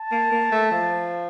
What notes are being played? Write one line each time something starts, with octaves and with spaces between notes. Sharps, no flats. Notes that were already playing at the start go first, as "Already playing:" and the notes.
Already playing: A5
A#3
A#3
A3
F3